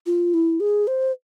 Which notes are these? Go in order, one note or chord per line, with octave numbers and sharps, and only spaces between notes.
F4
E4
G#4
C5